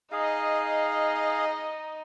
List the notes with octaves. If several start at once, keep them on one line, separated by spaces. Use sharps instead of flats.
D#4 G#4 D#5 F5